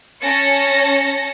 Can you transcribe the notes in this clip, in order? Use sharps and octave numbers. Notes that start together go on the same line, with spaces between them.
C#4 A5 A#6 C#7